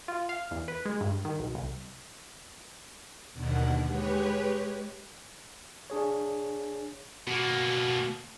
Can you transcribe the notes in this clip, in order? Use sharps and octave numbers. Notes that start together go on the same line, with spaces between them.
F4
F5
E2
B4
G#3
G2
D#3
B1
C2
D#2 B2 D3 D#3 F#5
G#3 G4 B4 C#5
D4 G#4 C#5
B2 A#3 F#4